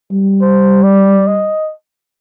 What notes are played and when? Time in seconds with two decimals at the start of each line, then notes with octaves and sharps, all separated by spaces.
0.12 G3
0.41 C5
0.83 D5
1.27 D#5